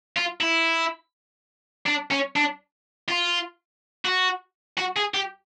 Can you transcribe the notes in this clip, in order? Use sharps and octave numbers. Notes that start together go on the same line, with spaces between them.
F4
E4
D4
C#4
D4
F4
F#4
F#4
G#4
G4